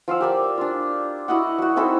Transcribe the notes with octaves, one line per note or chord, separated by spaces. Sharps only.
F3 F5 F#5 E6
G4 A#4 D5
D4 F4
E4 F#4 D#5 F#5
F#3 F#4
C4 D#4 E4 A4